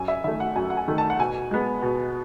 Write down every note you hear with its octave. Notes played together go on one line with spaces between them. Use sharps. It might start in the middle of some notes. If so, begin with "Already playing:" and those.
Already playing: F#2 G#5
E5
D#3 A3 E5
F#5
F#2 G#5
F#5
G#5
D#3 A3
A5
F#5
B2 G#5
G#3 B3
B2